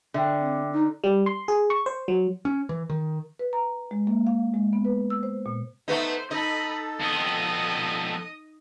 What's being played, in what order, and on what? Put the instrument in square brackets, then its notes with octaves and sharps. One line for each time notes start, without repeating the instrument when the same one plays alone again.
[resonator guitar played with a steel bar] D3 [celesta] E5 G5
[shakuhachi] C4
D#4
[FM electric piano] G3
C6
G#4
C#6
C5
F#3
[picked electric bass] C#4
E3
D#3
[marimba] B4
A#5
G#3
A#3
F5
G#3
B3
B4
E6
C5
A#2
[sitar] A3 B3 D#4 [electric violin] C5
[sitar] D#4 [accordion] A4 [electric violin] D#5 B5
[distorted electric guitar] F2 B3 [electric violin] D#5 D#6